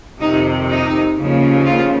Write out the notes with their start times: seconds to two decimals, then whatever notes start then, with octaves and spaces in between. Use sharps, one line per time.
0.21 F2 C3 D#3 D#4
0.70 D#4
1.17 D#2 C#3 F3
1.66 F4